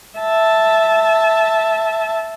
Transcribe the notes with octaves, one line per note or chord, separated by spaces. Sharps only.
E5 A5